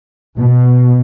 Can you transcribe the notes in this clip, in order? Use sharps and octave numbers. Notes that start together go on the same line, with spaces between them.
B2